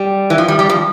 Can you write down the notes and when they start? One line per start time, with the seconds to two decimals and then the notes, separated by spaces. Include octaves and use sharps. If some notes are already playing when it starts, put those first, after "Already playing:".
Already playing: G3
0.30 E3
0.38 F3
0.48 G3
0.59 G3
0.69 F3